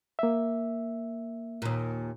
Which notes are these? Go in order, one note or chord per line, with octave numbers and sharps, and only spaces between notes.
A#3 E5
D#2 A#2